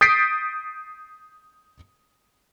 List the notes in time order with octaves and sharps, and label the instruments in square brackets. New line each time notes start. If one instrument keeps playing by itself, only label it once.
[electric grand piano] D#6 G6 A6 B6 C7 D7